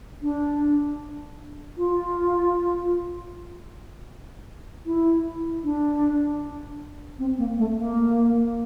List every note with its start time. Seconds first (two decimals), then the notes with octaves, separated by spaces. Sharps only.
0.22 D4
1.78 F4
4.86 E4
5.64 D4
7.19 C4
7.38 A#3
7.58 A3
7.77 A#3